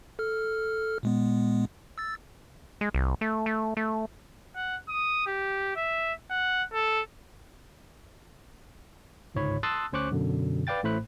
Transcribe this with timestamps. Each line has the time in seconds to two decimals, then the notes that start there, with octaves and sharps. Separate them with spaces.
0.19 A4 F6
1.03 A#2 G#3 B3
1.98 E6 A6
2.81 G#3
2.94 C2
3.21 A3
3.46 A3
3.77 A3
4.55 F#5
4.89 D#6
5.26 G4
5.76 E5
6.30 F#5
6.73 A4
9.35 G1 C#2 G#2 C#5 B5
9.63 A5 C6 D#6 E6 F#6 A6
9.93 D2 C#4 C5 C#6 D6 F#6
10.11 F#2 B2 D3
10.67 B4 D5 F5 G5 A6
10.83 A1 A2 A3 C5 B5 F#6